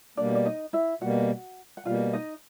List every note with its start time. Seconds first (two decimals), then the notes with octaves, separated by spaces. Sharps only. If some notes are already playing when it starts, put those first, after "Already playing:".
0.17 B2 G3 A#3 D4 D5
0.35 D5
0.45 D#4 D#5
0.73 E4 E5
1.01 B2 G3 A#3 F#4 F#5
1.77 F#5
1.85 B2 G3 A#3 F4 F5
2.13 D#4 D#5